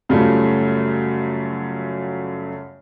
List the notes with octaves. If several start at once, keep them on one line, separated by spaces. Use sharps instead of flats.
F#2 C#3 G3 A3 F4